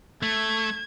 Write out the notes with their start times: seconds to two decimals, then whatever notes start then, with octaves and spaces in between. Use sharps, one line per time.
0.22 A3 G#6